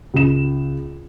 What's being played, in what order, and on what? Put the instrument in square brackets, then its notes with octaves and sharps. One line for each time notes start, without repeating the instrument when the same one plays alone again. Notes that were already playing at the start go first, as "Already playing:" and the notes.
[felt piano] C#2 E7